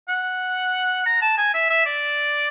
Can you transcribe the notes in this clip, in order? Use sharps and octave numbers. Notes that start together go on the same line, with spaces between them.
F#5
A#5
A5
G#5
E5
E5
D5